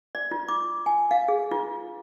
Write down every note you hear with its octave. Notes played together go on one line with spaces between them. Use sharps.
D5
F4
D6
G#5
F5
G#4
F4